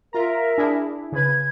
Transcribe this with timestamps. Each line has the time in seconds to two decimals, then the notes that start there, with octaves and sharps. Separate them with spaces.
0.13 F4 A#4 E5 A#5
0.58 D4 E4 G#4
1.12 C#3 B4 G#6